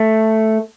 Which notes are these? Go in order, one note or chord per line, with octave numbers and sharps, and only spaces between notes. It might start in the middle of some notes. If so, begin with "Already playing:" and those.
Already playing: A3